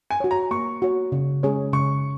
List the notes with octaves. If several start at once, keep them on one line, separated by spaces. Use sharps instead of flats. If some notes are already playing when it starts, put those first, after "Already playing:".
G#5
F#4 C#5
A#5
A#3 C#6
F#4 C#5
C#3
G#3 C#4 G#4 C#5
C#3 C#6